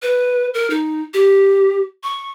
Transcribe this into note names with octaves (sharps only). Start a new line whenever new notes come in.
B4
A#4
D#4
G4
C#6